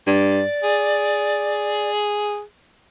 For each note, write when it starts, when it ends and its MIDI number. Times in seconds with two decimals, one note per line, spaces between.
0.07 0.43 43
0.07 1.90 74
0.63 2.42 68